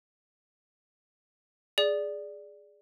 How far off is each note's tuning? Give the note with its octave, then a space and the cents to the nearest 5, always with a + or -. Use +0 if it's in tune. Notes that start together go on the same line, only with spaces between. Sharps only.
G#4 +0 D5 +0